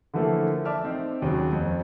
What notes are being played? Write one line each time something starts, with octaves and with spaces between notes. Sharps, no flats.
D3 E3 F3 A3 A#3 A4
D5 E5 A5 D6 F6
C4 D#4
D#2 C#3 F#3
F2